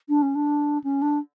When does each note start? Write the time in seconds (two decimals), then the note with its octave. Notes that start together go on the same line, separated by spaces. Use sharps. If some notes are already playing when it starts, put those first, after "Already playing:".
0.09 D4
0.22 C#4
0.35 D4
0.84 C#4
1.02 D4